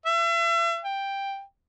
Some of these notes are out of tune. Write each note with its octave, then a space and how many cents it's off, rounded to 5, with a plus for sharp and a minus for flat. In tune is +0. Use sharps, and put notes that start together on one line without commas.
E5 +40
G5 +5